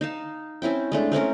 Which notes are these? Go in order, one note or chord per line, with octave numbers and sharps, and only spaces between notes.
D#4 F5 A5
C4 C#4 E4 G5
G#3 A3 D4
A3 C4 C#4 A#4